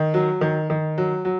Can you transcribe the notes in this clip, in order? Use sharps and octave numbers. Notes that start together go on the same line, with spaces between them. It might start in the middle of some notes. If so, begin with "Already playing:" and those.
Already playing: D#3
F#3
D#3
D#3
F#3
F#3